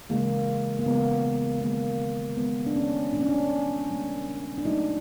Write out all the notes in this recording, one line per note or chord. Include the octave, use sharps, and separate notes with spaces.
C#3 E3 G#3 A#3
A#3
C#3 E3 G#3 B3
D#3 G#3 A#3
D#3 G#3 B3
D4
C#4
A#2 G3 A#3 D4
C#4
D4
A#2 G3 A#3
D4
A#2 F#3 A3 D#4